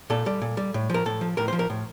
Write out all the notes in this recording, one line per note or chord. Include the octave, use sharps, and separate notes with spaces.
A#2 A4
G3
A#2
G3
A2
F3 A#4
A2 A4
F3
A2 A#4
C5
F3
A#4
A2